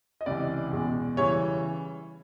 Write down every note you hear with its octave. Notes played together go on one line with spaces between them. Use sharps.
D#5
C#2 C3 E3 D5
E2 B2 G#3
C#3 E3 G3 C#5